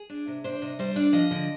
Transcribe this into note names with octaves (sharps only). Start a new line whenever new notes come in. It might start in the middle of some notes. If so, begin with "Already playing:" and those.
Already playing: G#4
D4
C3
D4 C5
C3 D#5
G3 C5
D4 D5
F3 D#5
D3